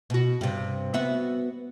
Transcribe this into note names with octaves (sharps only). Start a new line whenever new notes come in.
B2 F#4
G2 C3
B3 F#4 E5